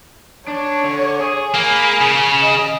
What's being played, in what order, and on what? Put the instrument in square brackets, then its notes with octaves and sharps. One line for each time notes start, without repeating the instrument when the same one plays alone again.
[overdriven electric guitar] D4 [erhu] C#5
[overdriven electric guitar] D3
G#4
[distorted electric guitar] A#3 [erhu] B5
[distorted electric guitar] C#3
[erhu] D#5